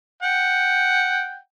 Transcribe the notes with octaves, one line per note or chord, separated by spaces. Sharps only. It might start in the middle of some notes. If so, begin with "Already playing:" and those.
F#5 G5